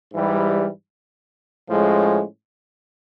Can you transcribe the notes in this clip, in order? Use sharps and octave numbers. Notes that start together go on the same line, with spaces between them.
G#2 E3 G3
A2 F3 G#3 C#4